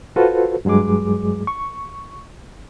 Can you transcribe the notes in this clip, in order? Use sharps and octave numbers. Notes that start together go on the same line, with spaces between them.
F4 F#4 A4 B4 C5
G2 F#3 G#3 G#4 D6
C#6